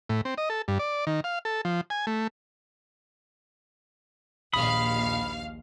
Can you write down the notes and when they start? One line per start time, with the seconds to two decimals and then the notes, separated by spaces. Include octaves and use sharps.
0.09 A2
0.25 C4
0.38 D#5
0.50 A4
0.68 G2
0.79 D5
1.07 D#3
1.24 F5
1.45 A4
1.65 F3
1.90 G#5
2.07 A3
4.54 A#1 D#2 F5 B5 D#6